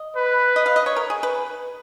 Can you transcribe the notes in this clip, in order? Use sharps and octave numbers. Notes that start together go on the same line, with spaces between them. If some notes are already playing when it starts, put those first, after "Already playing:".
Already playing: D#5
B4
D#5
F5
D#5
C#5
A#4
G#4
B4